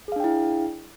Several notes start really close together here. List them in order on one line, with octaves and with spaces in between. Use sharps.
G#4 F5 D4 G5 E4